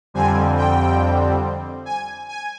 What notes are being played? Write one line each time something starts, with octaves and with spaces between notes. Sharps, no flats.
F2 D3 G3 C4 G#5
G5
G#5
G#5